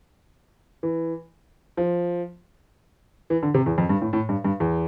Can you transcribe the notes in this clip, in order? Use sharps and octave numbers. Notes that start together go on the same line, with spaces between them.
E3
F3
E3
D3
C3
E2
F2
G2
A2
A2
G2
G2
E2